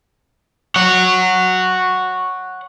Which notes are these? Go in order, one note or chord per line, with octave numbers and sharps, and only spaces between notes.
C#5 F#5